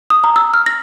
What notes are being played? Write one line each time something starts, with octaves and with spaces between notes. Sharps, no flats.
D#6
A#5
E6
F6
A#6